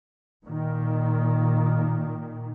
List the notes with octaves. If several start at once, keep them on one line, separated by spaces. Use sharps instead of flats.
A#2 D#3